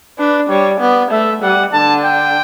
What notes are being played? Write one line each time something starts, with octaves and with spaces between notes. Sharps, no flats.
D4 B4
G3 C#5
B3 D5
A3 E5
G3 F#5
D3 A5
G5